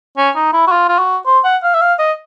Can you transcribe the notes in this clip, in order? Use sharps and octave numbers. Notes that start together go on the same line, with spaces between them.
C#4
D#4
E4
F#4
F4
F4
F#4
C5
F#5
F5
E5
F5
D#5